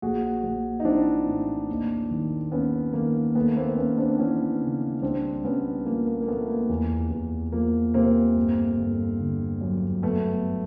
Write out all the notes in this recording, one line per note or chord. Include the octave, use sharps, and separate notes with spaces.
A#1 F#4 G#4
A#1
D#4
E3 C4 D4
A2
D#2
D#3
D#2 B3 C#4
D#3 A#3
D#2 A3 B3
A#3 C4
D#2 B3 C#4
C4 D4
E3 B3 C#4
C#3
C2 C4 D4
C2 B3 C#4
F3 A#3
A#3
A#3
A#2 A3 B3
A#3
E2
E2
F3 A#3
C3 A#3 C4
G1
G1
D3
F#2
G1 A3 B3